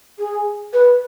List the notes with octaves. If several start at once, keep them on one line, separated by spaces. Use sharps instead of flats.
G#4
B4